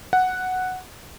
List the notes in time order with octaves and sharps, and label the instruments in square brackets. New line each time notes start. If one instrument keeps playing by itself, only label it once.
[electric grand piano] F#5